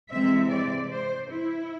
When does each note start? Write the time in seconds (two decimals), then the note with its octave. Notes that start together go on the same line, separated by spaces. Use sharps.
0.11 C3 E3 G#3 C4 E5
0.51 D5
0.91 C5
1.30 E4